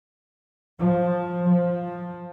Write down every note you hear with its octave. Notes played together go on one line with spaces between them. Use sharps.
F3
F3